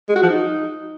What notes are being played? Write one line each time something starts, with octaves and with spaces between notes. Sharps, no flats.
G#3
F#4
F3
D#4